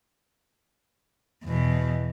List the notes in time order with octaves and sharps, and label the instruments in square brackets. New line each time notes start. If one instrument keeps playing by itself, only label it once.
[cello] E2 B2